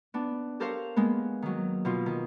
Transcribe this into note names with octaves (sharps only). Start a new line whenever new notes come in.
B3 D4
G4 A4 A#4 C5 C#5 F5
G#3 A#3 B3
D#3 F#3
B2 F3 F4
D#3